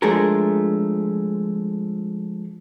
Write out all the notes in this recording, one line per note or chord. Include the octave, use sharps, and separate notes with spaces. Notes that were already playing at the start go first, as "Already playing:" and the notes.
F3 G#3 A3 D4 G#4 A#4